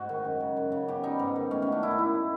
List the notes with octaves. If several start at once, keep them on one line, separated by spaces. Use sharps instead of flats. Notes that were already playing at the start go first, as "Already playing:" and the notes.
Already playing: G#2 F#4
D#3
F#2
C#3
F#2
C#3
B2 G4
G3 D#4
G#2
D#3
A2 C#4
F#3 C#4
D4
F#2 E4
D#4
D#3 E4